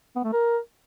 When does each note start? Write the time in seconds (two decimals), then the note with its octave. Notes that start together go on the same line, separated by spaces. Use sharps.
0.16 B3
0.24 A3
0.33 A#4